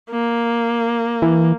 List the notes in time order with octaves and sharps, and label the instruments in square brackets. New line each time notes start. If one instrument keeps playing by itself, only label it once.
[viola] A#3
[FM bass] E3